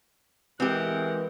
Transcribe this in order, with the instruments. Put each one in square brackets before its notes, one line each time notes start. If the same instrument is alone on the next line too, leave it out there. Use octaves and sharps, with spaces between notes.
[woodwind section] E3 [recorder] G#3 [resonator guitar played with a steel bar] C4 G4 [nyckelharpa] A#4 F#5